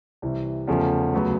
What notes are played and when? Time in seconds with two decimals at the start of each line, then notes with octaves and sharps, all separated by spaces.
0.22 C2 C3 E3
0.67 E2 C#3 F3 A3 C#4
1.13 D2 C#3 F#3 B3